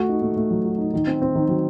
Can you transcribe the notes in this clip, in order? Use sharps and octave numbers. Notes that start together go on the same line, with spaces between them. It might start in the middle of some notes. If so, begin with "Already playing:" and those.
Already playing: A3 F#4
D#4
A3
A3
F#3
F#4
D#4
D#3
C4
C4
D#3
F#3